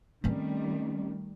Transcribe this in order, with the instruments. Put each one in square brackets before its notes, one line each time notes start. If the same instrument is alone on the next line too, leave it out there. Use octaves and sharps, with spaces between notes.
[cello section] D#3 G3 A3 [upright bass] C4 C#4